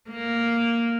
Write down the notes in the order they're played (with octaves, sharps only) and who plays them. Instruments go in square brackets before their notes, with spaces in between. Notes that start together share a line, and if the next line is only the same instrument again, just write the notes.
[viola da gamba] A#3